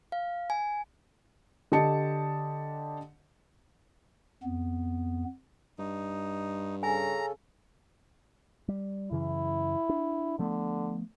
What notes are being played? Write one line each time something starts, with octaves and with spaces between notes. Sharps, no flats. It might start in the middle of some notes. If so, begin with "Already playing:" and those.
F5
G#5
D3 G4 D#5 A5 C#7
F2 B3
G2 D#4
C#3 C#4 A4 G#5 A#5
G3
F#2 C#3 E3 E4
D4
D3 F3 A3 B3